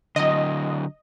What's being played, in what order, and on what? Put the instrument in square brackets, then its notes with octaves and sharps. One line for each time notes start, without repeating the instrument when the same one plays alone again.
[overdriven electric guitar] D3 F#3 [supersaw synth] D#5